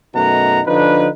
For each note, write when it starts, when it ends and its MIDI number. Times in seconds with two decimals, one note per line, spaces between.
0.15 0.61 42
0.15 0.61 47
0.15 0.61 57
0.15 0.61 63
0.15 0.61 78
0.15 0.61 82
0.67 1.08 50
0.67 1.08 53
0.67 1.08 62
0.67 1.08 63
0.67 1.08 71